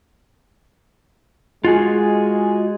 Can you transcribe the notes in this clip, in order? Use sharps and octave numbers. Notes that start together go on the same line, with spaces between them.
G#3 F4 F#4 G#4